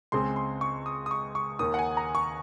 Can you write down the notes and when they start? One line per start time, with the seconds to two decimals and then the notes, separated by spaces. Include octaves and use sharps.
0.12 C#2 C#3 G#3 C4 C6
0.36 C6
0.61 C#6
0.86 D#6
1.06 D#6
1.11 C#6
1.35 C#6
1.59 D#2 D#3 A#3 D#6
1.74 F#5
1.79 G#5
1.97 A#5
2.15 C#6